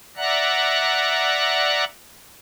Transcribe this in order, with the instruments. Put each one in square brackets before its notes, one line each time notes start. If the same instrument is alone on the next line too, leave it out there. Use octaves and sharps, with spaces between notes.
[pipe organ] D5 E5 F#5 A#5 F#6